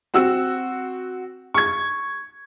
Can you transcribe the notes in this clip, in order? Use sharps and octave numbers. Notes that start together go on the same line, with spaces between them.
C4 F#4 E6
C#6 G#6